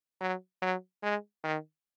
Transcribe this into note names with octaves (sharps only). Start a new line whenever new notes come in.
F#3
F#3
G#3
D#3